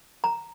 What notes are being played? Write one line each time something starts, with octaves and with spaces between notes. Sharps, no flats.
A#5